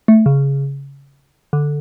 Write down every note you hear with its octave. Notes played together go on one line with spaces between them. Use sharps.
A3
C#3
D3